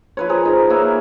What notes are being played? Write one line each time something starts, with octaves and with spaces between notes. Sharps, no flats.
F3 B4 C#5
G#4 A#4 C5
D#4
A#3 B4 C#5 E5